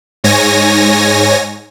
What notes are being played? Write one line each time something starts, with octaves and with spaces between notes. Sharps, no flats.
G#2 C#5 G#5 A#6